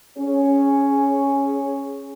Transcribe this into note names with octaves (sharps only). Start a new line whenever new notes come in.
C#4 G#4 C#5